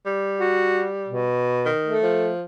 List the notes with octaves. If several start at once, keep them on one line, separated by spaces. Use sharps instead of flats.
G3
F#4
B2
D#3
A3
F3